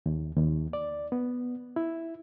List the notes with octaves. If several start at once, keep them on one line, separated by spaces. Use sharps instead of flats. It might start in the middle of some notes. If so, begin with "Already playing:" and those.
D#2
D#2
D5
B3
E4